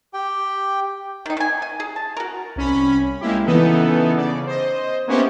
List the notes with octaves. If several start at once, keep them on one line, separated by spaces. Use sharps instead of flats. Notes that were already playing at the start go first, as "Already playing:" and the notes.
G4 G5
D#3 D#4
D#3 G#5
G#5
G#4
A5
F#4 A#4
C2 C#4 B5
G#3 A#3 E4 G4
C#3 E3 B3 D#4 A4
C#3 D5
C5 D#5
A#3 B3 C#4 E4 G4 C5